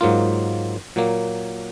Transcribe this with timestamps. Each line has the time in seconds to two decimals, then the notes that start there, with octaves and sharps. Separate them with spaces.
0.01 G#2 F#3 A#3 F4
0.96 A#2 F#3 A#3